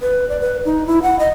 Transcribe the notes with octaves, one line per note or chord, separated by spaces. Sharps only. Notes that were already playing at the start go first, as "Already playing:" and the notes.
B4
D5
B4
D#4
E4
F#5
D#5